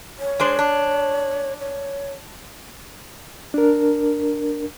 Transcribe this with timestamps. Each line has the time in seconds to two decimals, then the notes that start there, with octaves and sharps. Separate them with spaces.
0.19 C#5
0.40 G#3 D4 C5
0.59 D4
1.60 C#5
3.54 D4 A#4